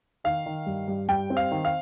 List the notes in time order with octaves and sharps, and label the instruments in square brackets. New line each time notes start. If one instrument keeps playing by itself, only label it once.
[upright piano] D#3 [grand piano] F5
[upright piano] D#3
G2
G2
[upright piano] G2 [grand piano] G5
[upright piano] C4
[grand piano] F5
[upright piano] D#3
[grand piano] F5